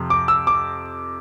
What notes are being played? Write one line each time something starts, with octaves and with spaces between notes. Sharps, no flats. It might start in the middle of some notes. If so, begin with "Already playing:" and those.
Already playing: F2 C3
D6
E6
D6